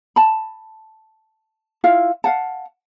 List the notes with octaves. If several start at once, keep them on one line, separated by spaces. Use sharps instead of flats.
A5 B5
E4 F4 E5 F5
F5 F#5 A5